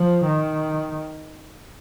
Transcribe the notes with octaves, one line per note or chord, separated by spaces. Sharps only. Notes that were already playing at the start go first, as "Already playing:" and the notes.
Already playing: F3
D#3